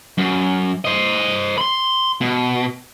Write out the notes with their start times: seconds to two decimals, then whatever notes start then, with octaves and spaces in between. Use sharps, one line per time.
0.18 F#2
0.85 C5 D#5
1.58 B5 C6
2.21 B2